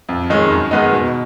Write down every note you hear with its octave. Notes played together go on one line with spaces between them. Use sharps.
F2
D#3 G#3 C#4
F#2
D#3 G#3 B3 D#4
B2